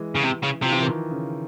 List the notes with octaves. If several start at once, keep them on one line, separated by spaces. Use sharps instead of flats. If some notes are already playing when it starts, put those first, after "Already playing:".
Already playing: E3 G#3
C#3
C3
C#3
C3 F3
E3
D#3
C#3